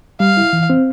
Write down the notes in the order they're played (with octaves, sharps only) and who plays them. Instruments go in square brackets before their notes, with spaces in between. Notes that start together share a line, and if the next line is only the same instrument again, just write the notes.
[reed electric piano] G3 [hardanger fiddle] F5
[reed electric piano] E4
E3
C4